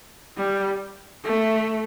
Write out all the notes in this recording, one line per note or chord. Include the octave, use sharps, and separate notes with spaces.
G3
A3